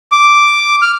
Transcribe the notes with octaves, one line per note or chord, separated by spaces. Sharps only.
D6
F6